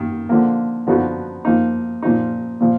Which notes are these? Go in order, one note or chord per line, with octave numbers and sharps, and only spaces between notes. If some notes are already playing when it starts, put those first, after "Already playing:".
Already playing: D#3 A#3
D3 F3 A#3
D3 F3 B3 D#4 F#4
F3 A#3 D#4
A#2 F3 A#3 D#4
A#2 F3